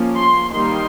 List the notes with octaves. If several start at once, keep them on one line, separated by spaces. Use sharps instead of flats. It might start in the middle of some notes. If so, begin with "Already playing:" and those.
Already playing: F3 A#3 C#4
C6
D#3 G3 A#3 D#4 C6